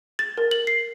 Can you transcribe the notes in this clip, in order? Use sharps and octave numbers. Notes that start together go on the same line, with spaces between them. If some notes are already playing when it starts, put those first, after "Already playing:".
A6
A#4
F#7
C7